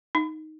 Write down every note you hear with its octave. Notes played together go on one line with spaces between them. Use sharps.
D#4